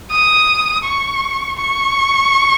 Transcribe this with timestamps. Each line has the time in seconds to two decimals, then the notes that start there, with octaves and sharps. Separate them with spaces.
0.11 D#6
0.84 C#6
1.58 C#6